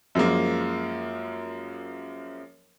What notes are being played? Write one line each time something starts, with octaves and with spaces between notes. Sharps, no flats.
F#2 F3 G#3 A#3